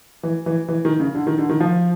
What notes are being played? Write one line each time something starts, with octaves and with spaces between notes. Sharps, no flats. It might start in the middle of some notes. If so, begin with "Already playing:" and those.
E3
E3
E3
D#3
C#3
D3
D#3
D3
D#3
F3